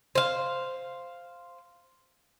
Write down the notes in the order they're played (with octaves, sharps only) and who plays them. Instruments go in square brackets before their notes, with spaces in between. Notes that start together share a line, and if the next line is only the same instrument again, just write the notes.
[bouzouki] C5 F5